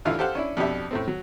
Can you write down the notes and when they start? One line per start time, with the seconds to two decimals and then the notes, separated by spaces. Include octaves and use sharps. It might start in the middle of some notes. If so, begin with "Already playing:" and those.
0.05 A1 D3 E3 F4 E5 F5
0.19 G4 A4 C5 F5 F#5
0.35 C#4 D4 E4
0.57 F2 B2 D4 G4 E5
0.91 A2 A3 C4
1.08 F#3